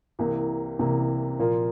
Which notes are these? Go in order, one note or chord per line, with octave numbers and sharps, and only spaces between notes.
C2 C3 E3 A#3
C2 C3 E3 A#3
A#2 F3 A#3 F4